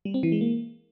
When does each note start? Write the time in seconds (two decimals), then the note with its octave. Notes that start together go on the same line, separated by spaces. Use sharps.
0.05 G3
0.14 C4
0.23 E3
0.32 G#3
0.41 A#3